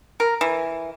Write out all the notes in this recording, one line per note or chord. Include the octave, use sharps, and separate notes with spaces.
A#4
E3